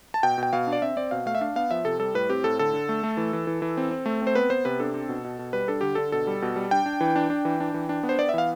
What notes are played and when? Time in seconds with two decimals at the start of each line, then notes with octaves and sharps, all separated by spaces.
0.14 A5
0.23 B2 G5
0.38 B2
0.43 G5
0.53 B2 F5
0.67 D4
0.73 D5
0.82 C4 E5
0.97 C4 D5
1.11 B2 F5
1.26 A3 F5
1.35 E5
1.41 D4 F5
1.56 B3 F5
1.71 F3 E5
1.85 C3 A4
1.99 G3 A4
2.14 A2 B4
2.29 C4 G4
2.44 A2 A4
2.59 D3 A4
2.73 D3
2.89 A3
3.03 A3
3.17 E3
3.33 E3
3.47 E3
3.62 E3
3.77 C4
3.91 C4
4.06 A3
4.22 C4
4.27 C5
4.35 B3 B4
4.50 B3 C5
4.65 C3 B4
4.80 D4 A4
4.94 C4
5.09 B2
5.24 B2
5.39 B2
5.53 G3 B4
5.68 D4 A4
5.81 D3 G4
5.95 D3 A4
6.12 B2 A4
6.27 G3
6.42 B2
6.56 G3
6.71 D4 G5
6.86 D4
7.01 E3
7.16 D4
7.30 D4
7.45 E3
7.60 D4
7.74 E3
7.89 D4
8.03 B3
8.09 C5
8.19 B3 D5
8.29 E5
8.34 E3 F5